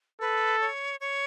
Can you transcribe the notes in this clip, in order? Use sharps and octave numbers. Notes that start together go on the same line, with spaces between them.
A4 B4
C#5
C#5